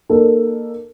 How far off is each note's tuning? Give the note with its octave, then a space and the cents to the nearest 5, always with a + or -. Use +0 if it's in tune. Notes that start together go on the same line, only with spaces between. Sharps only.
A#3 +0 D#4 -40 A4 +0